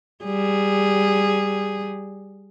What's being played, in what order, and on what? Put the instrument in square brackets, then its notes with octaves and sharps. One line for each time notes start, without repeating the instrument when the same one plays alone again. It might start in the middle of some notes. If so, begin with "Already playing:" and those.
[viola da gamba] G3 G#4